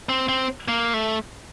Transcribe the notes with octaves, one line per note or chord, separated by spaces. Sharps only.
C4
C4
A#3
A3